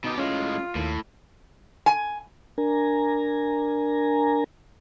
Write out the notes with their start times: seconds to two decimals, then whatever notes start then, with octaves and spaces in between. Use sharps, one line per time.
0.04 B2 D#4 G4
0.18 A2 G#3 C#4 F4
0.75 D#2 A2
1.86 G#5
2.58 D4 A#4 G#5 A#5